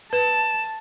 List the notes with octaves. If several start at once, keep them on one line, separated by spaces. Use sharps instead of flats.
B4 A5 E7